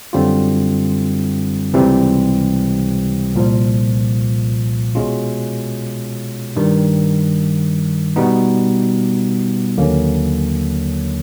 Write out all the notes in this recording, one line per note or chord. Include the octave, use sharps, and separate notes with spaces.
F#2 D3 G3 C4 F4
C#2 C3 E3 G3 C4
C2 A#2 F3
B2 G#3 C#4 F4
G2 D#3 G3
B2 G3 B3 D#4
D#2 D3 F#3 A#3 C#4